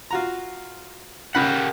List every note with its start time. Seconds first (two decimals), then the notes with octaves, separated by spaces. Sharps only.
0.11 F4 F#4 A#5
1.35 C#3 G4 A#4 F#5 B5